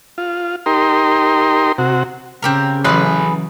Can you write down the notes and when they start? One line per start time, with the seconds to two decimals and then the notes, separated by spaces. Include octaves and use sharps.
0.18 F4
0.66 D#4 G4 A#4 C6
1.78 C3 F#4
2.43 C#3 C4 G4 A#4
2.84 A1 E3 F#3 G#4 B4 C6 F#6